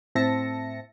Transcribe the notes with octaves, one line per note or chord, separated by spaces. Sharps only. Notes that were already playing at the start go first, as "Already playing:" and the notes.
A2 C4 E5 A5 A#6 C#7